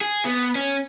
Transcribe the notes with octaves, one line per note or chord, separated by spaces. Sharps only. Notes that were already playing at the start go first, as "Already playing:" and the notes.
G#4
B3
C#4